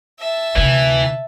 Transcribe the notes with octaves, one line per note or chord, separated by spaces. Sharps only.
E5 A5
D2 C3 E3